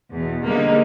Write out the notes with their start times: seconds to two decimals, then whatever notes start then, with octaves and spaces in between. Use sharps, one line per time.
0.11 E2 B2
0.45 D3 G3 G#3 A#3 D#4